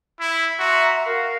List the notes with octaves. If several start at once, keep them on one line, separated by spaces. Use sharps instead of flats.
E4
F#4 E5 A#5 C6
F#4 A#4 F5